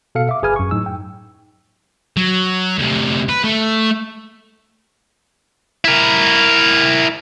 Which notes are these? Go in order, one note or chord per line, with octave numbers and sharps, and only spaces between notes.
B2 A4 F5 C#7
E5 D6
G1 G#4 B4 G#5 F6
F#2 C#6
A2 F#3 D#4 E6
G5
F#3
D2 C3
B4
A3
E4 A#4